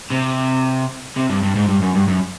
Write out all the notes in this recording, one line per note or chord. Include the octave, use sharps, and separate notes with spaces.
C3
C3
G2
G2
G#2
G2
F#2
G2
F#2